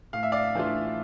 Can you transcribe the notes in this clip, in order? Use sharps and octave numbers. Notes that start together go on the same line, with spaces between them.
A2 F5
E5
D5 F5
E3 A3 D4 F4